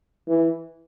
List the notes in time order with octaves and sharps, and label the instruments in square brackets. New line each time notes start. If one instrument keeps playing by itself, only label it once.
[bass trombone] E3